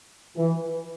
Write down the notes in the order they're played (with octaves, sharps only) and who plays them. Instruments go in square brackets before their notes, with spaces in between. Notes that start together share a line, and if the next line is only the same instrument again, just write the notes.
[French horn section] E3